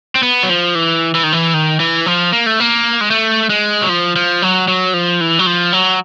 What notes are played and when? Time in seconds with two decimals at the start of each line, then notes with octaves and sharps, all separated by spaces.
0.15 C4
0.23 B3
0.43 F#3
0.50 F3
0.75 E3
1.15 E3
1.23 D#3
1.32 E3
1.54 D#3
1.80 E3
2.06 F3
2.33 A#3
2.46 A3
2.60 A#3
3.01 G#3
3.11 A3
3.50 G#3
3.82 F#3
3.89 F3
4.16 F3
4.42 F#3
4.68 F#3
4.94 F3
5.21 E3
5.39 F#3
5.46 F3
5.73 F#3